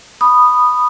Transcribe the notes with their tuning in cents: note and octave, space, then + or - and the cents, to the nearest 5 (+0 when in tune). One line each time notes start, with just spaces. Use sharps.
B5 +0 D#6 -10